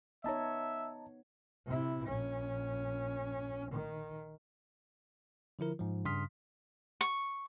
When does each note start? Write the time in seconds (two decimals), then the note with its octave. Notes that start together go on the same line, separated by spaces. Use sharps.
0.24 B3 D#4 C#5 D#5 E5 A5 A#5
1.66 C3 E4
2.08 A#1 C#4
3.72 D#3
5.59 D3 F3 E4 A#4
5.79 G#2 F3
6.05 G2 C#3 C6 D#6 F6 B6
7.01 C#6